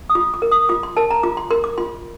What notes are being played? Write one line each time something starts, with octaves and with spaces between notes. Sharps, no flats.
D#6
F4 D6
D6
A#4
D#6
F4 D6
C6
A#4 A5
A#5
F4 D6
C6
A#4 C6
D6
F4 C6